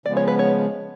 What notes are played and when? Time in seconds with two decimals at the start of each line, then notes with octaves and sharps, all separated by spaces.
0.06 C#3 F3 G#3 B3 D5
0.17 C#5
0.28 B4
0.39 C#5